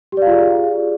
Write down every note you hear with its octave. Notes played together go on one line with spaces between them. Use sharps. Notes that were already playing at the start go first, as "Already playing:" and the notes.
F4 G4 G#4 D5 F5